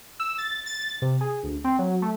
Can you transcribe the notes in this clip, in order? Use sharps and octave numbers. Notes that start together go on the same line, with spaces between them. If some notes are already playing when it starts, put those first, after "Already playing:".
E6
A6
A6
C3
G#4
D2
C4
F#3
A3